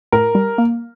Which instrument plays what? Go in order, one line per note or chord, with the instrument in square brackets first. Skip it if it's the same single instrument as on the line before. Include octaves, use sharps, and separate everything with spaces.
[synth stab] A2 [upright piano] A#4
[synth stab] G3
A#3